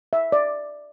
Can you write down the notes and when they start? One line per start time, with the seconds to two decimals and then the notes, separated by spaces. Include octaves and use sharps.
0.13 E5
0.32 D5